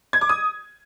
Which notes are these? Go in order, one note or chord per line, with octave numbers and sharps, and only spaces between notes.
G#6
D6
D#6